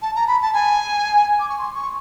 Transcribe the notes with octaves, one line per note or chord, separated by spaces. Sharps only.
A5
A#5
B5
A5
G#5
D6
C#6
C6
C#6